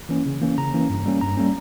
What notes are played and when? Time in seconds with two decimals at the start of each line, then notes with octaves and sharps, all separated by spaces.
0.09 E3 A#3 C#4
0.26 C#3
0.42 E3 A#3 C#4
0.58 C#3 A#5
0.74 E3 A#3 C#4
0.89 G2
1.06 G3 A#3 C#4
1.21 G2 A#5
1.37 G3 A#3 C#4